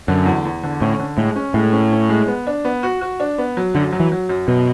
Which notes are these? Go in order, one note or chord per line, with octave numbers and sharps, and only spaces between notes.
F#2 D3
E2
E2
D3
A2 C#4
D3
A2 G#3
C#4
A2 G#3
C#4
C#4
G#3
B3
D4
B3
F#4
F#4
D4
B3
F#3
F#2 D3
F#3
E3
F#3
F#2
F#2 B2